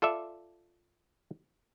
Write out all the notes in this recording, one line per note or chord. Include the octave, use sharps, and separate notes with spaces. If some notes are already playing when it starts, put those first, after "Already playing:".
F4 A4 D5 E5